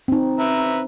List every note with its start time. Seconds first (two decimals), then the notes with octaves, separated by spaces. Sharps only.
0.08 C4 D#4
0.39 B4 E5 A#5